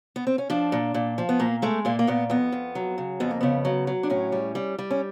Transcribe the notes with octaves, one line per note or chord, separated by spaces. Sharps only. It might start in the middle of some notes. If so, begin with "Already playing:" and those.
B3
C4
C#4
F3 D4
A#2
A#2
F3
B3
A#2 A#3
G#3 A3
A#2 A#3
A#3
A#2 B3
F2 B3
F2
F#3
C#3
F2 B3
A#3
C#3 B3
F#3
F#3
D4
A2 C#4
G3
G3
G3
C#4